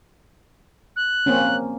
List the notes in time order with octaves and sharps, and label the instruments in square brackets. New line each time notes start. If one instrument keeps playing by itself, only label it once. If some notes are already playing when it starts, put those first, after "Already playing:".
[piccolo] F#6
[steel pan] A#3 C4 C#4